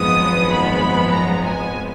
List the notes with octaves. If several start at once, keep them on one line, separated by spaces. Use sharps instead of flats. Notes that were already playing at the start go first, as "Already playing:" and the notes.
Already playing: G#1 F#2 F3 G#3 B3 D#6
B5
A#5
G#5